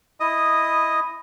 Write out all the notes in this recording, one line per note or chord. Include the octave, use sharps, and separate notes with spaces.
E4 D#5 D#6